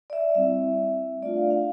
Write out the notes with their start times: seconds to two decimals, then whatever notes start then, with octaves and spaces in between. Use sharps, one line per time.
0.10 D5
0.13 E5
0.35 G3 C4 E4 E5
1.22 A3 D4 F4 D5
1.36 F5
1.51 F5